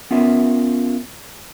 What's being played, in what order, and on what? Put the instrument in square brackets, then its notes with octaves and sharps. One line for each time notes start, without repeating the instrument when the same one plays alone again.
[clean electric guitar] B3 C#4 F4 A#4 E5